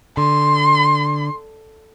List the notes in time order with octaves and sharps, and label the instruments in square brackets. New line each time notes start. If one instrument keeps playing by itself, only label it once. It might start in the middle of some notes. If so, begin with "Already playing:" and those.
[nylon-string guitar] D3 [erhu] C6